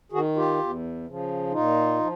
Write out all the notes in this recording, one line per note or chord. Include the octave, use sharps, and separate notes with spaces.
D#3 F#4 G#4
F4 G4
E2
C#3 F3
A#2 D#4 F4
F3